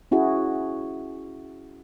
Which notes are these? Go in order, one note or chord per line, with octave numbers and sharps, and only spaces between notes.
C#4 E4 F#4 G#4